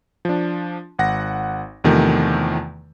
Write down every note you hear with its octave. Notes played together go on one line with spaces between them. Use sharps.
F3 D4
G#1 F#5 A#6
E2 C3 D#3 F3 A3